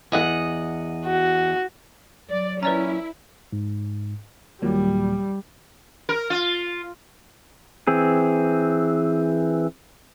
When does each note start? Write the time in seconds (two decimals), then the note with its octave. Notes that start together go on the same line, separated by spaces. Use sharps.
0.12 E2 D#5 F#5
1.05 F#4
2.29 F#3 D5
2.63 A#2 C#4 E4 B4 D5 A#5
3.52 G#2
4.62 D#2 A#2 F#3 G3
6.09 A#4
6.30 F4
7.87 E3 C4 G#4